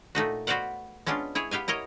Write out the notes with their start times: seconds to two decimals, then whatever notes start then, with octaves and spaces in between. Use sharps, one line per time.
0.15 A#2 A3 D#4 F#4
0.47 B3 F#4 C5 D5 F5 F#5
1.06 G#3 B3 C#4 D4 F4
1.35 E4 G#4 C#5
1.51 B3 G4 F5 G#5
1.68 E4 A#4 C#5 D#5